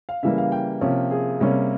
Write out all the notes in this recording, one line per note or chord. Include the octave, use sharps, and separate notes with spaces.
F5
C#3 E3 G3 A#3 E5
F5
G5
C3 F3 A#3 C#4
G#4
C3 G3 A#3 C#4